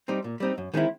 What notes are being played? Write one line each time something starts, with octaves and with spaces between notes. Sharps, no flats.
G3 C4 D#4
A#2
G3 C4 D#4
F#2
D#3 G#3 C4 E4